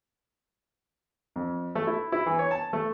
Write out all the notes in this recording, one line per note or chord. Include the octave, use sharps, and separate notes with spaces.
F2
A3
E4
E4
E3
C#5
A5
A3